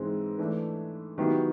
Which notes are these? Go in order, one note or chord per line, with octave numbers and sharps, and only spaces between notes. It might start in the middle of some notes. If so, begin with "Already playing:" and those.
Already playing: G#2 E3 G#3 C4
E3 A3 D4
D#3 F#3 B3 E4 G4